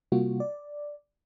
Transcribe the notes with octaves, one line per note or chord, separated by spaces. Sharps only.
C3 G3 A#3 F4 F#4
D5